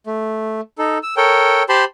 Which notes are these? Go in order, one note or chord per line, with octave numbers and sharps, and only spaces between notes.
A3
D#4 A4
E6
A4 A#4 C#5 G5
G4 C5 A5 B5 C6